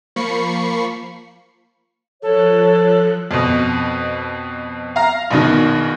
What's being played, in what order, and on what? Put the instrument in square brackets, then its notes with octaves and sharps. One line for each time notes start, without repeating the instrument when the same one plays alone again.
[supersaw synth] F3 A#3 B5 C#6 C7 C#7
[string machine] F3 F#6 [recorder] A4 [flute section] C#5
[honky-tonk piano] F2 B2
F5 A#5
A#1 B2 D#3